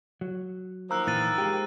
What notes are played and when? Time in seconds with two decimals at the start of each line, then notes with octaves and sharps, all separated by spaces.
0.21 F#3
0.91 D#3 F3 A#3 A#5 E6 F#6
1.07 A#2 E3 F#6 A6 D#7
1.38 G#3 G4